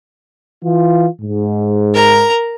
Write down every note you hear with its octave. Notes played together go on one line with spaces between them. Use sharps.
E3 F4
G#2
A#4 A#5